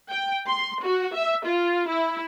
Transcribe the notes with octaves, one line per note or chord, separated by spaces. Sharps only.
G5
C6
F#4
E5
F4
E4